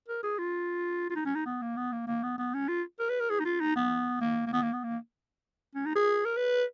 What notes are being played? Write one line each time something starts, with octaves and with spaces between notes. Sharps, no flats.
A#4
G#4
F4
F4
D#4
C#4
D#4
B3
A#3
B3
A#3
A#3
B3
B3
C#4
F4
A#4
B4
A#4
G#4
D#4
F4
D#4
B3
A#3
A#3
B3
A#3
B3
A#3
C#4
D#4
G#4
A#4
B4